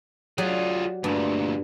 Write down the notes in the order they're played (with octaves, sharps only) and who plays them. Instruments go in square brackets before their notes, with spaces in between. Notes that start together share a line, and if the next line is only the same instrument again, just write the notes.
[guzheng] F#3 G4 D5 [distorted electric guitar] F4 G#4
[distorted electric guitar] D2 A#2 [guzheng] G2